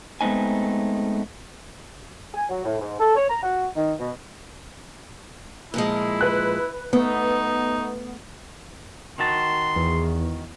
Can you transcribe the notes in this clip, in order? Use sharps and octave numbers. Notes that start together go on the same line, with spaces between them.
G#3 A3 B3 C4 D#4 G#5
G#5
F#3
A2
G#2
A4
C#5
A#5
F#4
D#3
B2
A#2 F3 G#3 E4
B4 F#6
A3 B3 D#4
D#3 F#4 A5 C6
E2